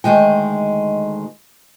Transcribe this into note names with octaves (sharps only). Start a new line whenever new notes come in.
D2 G#2 D#3 G#3 G5